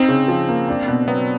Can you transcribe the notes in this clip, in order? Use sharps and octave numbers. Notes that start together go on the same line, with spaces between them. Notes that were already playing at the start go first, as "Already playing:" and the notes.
Already playing: C4 D#4
C#3
F3
A#3
D4
B2
F#3 B3